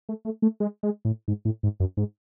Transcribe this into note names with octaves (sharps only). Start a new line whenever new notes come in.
A3
A3
A3
G#3
G#3
A2
G#2
A2
G#2
F#2
G#2